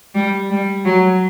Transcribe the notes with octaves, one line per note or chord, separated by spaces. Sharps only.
G3
G3
F#3